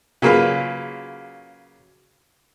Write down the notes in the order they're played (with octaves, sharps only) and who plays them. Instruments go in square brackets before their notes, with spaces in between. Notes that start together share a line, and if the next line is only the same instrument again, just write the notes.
[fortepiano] C#3 F#3 A#3 F4 B4